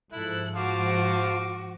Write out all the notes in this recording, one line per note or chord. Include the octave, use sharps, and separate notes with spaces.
G#2 F3 E4 A4 F#6
F#4 C5 F5 A5 D6